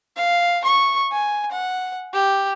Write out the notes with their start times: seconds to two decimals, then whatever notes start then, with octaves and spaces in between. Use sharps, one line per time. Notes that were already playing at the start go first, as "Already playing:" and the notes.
0.16 F5
0.65 C#6
1.12 G#5
1.52 F#5
2.14 G4